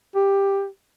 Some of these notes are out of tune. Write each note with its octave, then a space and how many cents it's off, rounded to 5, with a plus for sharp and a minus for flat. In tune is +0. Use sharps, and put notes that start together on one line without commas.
G4 +10